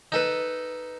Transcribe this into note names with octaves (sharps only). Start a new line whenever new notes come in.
D#4 A4 B4